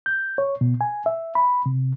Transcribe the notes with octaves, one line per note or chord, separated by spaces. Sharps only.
G6
C#5
B2
G#5
E5
B5
C3